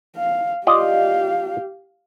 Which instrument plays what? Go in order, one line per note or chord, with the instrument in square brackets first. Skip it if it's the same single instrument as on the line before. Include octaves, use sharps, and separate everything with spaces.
[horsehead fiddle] F5
[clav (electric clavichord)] F4 D5 D#5 [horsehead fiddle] G4 F5